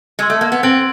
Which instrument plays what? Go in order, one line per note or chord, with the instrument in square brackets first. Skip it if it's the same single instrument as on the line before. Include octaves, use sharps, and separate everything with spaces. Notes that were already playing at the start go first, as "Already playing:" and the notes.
[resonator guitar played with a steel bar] G#3 [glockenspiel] C6 E6 G#6
[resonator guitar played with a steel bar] A3
A#3
B3
[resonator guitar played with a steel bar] C4 [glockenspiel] F#6 A6 D7 F#7